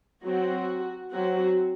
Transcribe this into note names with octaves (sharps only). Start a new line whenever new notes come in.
F#3 C4 F#4
F#3 C4 F#4